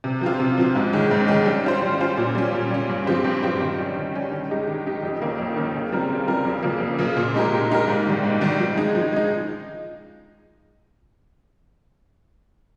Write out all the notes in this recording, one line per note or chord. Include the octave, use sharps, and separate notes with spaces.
C3
F3 C4 F4
C3
F3 C4 F4
G#2
D#3 G#3 C#4
G#2
D#3 G#3 C#4
G3
C#4 F4 C5
G3
C#4 F4 C5
A#2
G3 C#4
A#2
G3 C#4
G2
F3 C4 G4 C5
G2
F3 C4 G4 C5
D#3
G3 C#4
D#3
G3 C#4
D#3
G#3 D#4 G4
D#3
G#3 D#4 G4
F2
D#3 A#3 C#4
F2
D#3 A#3 C#4
C#3
G3 C4 F4 A#4
C#3
G3 C4 F4 A#4
F2
C#3 F3 A#3
F2
C#3 F3 A#3
A#2
G#3 D#4 G4 A#4
A#2
G#3 D#4 G4 A#4
G#2
D#3 G3
G#2
D#3 G3
F3
G#3 D#4
F3
G#3 D#4